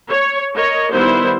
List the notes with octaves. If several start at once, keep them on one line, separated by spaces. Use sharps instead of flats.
C#5
A#4 C#5 D#5
D#3 G3 B3 E4 C5